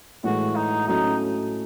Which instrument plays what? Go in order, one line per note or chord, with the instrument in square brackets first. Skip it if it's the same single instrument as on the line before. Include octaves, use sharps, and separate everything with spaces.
[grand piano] A2 E3 G#3 [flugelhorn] F#4
[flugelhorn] D#4
[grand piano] A2 F#3 A3 C#4 F#4 [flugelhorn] D#4